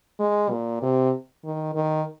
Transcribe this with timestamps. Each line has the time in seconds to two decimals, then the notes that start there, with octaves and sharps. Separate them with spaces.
0.20 G#3
0.51 A#2
0.82 C3
1.44 D#3
1.75 D#3